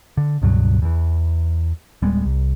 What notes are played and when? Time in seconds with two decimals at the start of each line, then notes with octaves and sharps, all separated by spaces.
0.17 D3
0.42 C#2 G2 B2 F#3
0.82 E2 E3
2.02 D1 G3 G#3 B3
2.25 C2